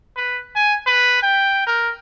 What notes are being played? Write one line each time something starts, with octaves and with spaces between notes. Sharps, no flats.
B4
G#5
B4
G5
A#4